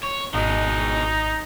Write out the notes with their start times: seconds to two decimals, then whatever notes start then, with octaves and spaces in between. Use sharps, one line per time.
0.03 C#5
0.34 G#1 B2 G#3 D#4